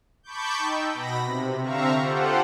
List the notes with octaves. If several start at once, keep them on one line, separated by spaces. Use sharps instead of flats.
A5 B5 C#6 D6 G6
D#4 G5 E6
B2 B5 A#6
C3
D3 C4 E5 F5 A#5 C#6
F4 G4 A4 C5 F#5